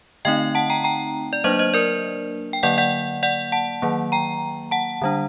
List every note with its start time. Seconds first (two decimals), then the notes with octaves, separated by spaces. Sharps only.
0.25 D3 A3 C4 D#4 D#5 G5
0.55 F#5 A5
0.70 G5 A#5
0.84 G5 A#5
1.33 D5
1.44 F#3 A#3 D4 C5 D#5
1.59 C5 D#5
1.74 A#4 D5
2.53 G5
2.63 D3 F#3 A#3 D5 F#5
2.78 D5 F#5
3.23 D5 F#5
3.52 F#5 A5
3.82 D#3 F#3 A#3
4.12 G5 A#5
4.71 F#5 A5
5.02 D3 G3 D4